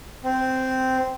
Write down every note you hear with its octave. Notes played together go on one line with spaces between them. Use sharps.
C4